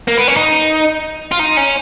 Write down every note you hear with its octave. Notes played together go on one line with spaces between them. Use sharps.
A#3
B3
C#4
D#4
F4
D#4
C#4